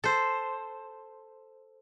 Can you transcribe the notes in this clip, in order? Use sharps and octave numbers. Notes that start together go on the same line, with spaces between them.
A4 C5